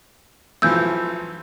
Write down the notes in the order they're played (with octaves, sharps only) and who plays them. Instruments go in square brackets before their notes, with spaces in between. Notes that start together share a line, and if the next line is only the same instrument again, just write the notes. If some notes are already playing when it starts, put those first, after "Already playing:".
[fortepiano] B1 E3 F3 [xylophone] E6 G6